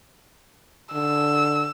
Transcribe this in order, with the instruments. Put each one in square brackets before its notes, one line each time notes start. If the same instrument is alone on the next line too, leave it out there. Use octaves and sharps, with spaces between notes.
[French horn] D3 [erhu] E6